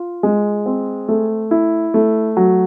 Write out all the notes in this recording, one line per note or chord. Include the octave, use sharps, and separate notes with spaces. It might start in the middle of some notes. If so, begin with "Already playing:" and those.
Already playing: F4
G#3
C4
A3
E4
A3
F#3